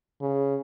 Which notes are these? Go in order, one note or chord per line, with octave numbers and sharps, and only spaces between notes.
C#3